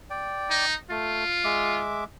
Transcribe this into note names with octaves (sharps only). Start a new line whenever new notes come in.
D5 G5
D#4
A3 F4
G#3 E5 D6